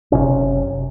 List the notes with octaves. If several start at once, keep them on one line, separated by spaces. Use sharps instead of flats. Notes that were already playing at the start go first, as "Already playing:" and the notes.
F#1 C2 C3 C#4